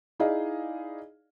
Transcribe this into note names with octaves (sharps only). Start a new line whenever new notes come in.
D#4 E4 G#4 D5 D#5 F5